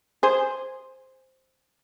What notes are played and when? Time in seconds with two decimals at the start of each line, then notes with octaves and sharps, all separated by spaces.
0.23 G#4 C5